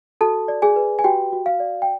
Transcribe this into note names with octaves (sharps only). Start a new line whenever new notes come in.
F#4 A4 A5
D5
G#4 G#5
B4
G#5
F#4 G4 G5
F#4
F5
D5
G5